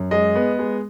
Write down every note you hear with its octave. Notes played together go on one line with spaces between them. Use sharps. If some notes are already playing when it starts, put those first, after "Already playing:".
Already playing: F#2
G#3 D#5
B3
G#3